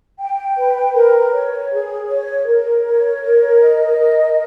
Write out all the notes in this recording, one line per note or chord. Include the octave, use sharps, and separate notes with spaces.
G5
B4
A#4
C#5
G#4
C#5
A#4
C#5
A#4
D#5
A#4